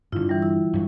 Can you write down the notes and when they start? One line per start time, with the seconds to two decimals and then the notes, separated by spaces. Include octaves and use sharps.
0.12 G2 D3 E4 F4
0.29 E3 G3
0.42 E4
0.74 G2 F#3